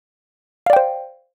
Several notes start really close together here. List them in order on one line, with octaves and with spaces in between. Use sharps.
F5 D5 G5 C5